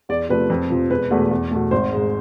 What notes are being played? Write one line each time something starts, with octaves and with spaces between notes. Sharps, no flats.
E2 D5
C3 F3 A3 B4
F2
C3 F3
E1 B4
E2 B2 A3
E2
B2 A3
G#1 C5
G#2 G#3